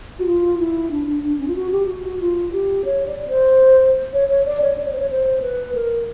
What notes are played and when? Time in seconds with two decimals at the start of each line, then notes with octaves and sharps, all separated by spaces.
0.19 F#4
0.26 F4
0.59 E4
0.91 D4
1.07 D4
1.24 D4
1.39 C#4
1.48 F4
1.56 F#4
1.72 G4
1.88 F#4
2.04 F#4
2.20 F4
2.52 G4
2.85 C#5
3.07 D5
3.28 C5
4.13 C#5
4.29 C#5
4.46 D5
4.62 C#5
4.78 D5
4.85 C#5
4.93 C5
5.00 C#5
5.11 C5
5.42 B4
5.75 A#4